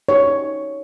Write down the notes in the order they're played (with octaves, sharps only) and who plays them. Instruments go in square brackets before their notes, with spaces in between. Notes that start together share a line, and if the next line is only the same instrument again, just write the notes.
[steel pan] D#4 G4 C5 C#5